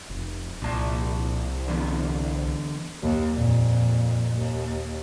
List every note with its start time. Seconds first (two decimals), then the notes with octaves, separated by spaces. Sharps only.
0.10 F1
0.62 C2 A#2 F3 A5
1.68 D3 E3 B3
3.03 D#2
3.33 F2 A#2
4.35 D#2